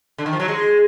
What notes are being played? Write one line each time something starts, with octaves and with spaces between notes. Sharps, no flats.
D3
D#3
F3
F#3
G#3